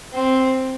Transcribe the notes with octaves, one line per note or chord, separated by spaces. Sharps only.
C4